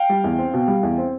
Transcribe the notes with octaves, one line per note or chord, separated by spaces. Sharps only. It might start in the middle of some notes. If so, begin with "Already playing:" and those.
Already playing: F5 G5
G3
E2
C4
B2
G3
E2
C4